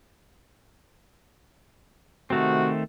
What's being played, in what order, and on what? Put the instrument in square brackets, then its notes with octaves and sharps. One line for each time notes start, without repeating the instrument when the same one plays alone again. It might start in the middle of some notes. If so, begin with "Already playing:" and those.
[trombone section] C3 F#4 [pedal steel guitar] D#3 A3 C4